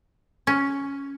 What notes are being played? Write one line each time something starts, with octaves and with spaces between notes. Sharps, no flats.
C#4